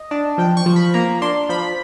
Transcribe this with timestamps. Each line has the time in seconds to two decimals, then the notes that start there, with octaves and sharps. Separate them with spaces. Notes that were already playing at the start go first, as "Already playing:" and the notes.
Already playing: D#5
0.11 D4
0.38 F3 G5
0.57 C#6
0.66 F3
0.76 B5
0.94 A#3 A#5
1.22 D4 C6
1.49 F3 B5